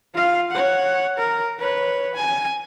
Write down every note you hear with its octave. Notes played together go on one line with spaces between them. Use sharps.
F4 F5
C#5 F#5
A#4
B4 C#5
G#5